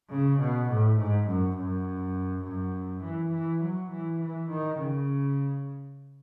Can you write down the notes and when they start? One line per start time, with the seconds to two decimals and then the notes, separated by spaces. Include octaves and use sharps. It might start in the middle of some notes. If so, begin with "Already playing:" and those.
0.10 C#3
0.40 B2
0.69 A2
0.98 G#2
1.27 F#2
1.57 F#2
2.45 F#2
3.04 E3
3.32 E3
3.62 F#3
3.91 E3
4.20 E3
4.49 D#3
4.79 C#3